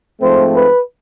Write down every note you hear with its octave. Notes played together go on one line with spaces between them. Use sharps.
G#2 F3 A3 C4 C5
B4